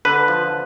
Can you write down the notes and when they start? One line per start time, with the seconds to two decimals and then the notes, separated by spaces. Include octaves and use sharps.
0.05 D3 B4
0.28 F3